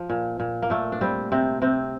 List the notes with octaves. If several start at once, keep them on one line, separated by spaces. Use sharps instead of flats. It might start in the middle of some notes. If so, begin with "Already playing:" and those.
Already playing: F3
A#2
A#2
A#3
A#2 A3
D4
G3 C4
C3 C4
C3 C4